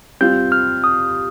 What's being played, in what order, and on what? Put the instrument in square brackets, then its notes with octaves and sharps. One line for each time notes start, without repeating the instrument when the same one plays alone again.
[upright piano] G3 C4 F4 [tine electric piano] G6
[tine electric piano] F6
D#6